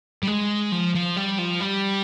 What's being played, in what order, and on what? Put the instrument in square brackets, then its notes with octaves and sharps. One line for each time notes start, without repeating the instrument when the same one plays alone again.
[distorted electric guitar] G3
G#3
F3
F3
G3
F3
G3